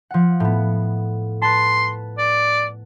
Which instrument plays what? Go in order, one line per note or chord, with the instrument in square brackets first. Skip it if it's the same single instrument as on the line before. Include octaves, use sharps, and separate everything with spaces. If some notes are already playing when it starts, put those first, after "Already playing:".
[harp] F3 F#5
A2 B3
[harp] B4 A5 [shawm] C6
[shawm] D5